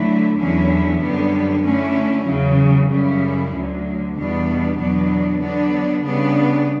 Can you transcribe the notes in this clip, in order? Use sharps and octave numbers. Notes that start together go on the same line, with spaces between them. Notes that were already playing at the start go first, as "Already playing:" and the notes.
Already playing: D3 F#3 A3 E4
E2 D3 F#3 C#4 E4
F#2 D3 G3 B3
D3 A3 C#4 E4
E2 C#3 F#3
F#2 C#3 G3 C#4 E4
D2 D3 F#3
E2 B2 G3 B3 D4
E2 B2 F#3 B3 D4
D3 F#3 B3 D4
C#3 G3 B3 D4